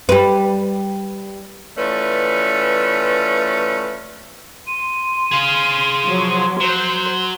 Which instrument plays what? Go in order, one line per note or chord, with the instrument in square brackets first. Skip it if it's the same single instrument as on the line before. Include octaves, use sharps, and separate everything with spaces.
[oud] G3 B4
[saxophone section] E3 A3 C#4 F4 B4 D5
[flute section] C6 [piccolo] D#7
[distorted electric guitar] G#4 F5
[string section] F3 F#3
[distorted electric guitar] F#3 [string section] C5